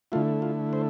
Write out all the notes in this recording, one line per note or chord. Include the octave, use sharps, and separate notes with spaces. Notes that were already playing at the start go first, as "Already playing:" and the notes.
D3 A3 E4 F4
F4
C5